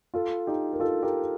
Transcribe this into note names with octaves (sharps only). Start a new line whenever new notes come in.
F4 A4
D#4 G4
A#4
F4 A4
G4 A#4